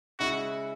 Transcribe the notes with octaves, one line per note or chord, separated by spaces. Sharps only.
C#3 G#3 E4 F#4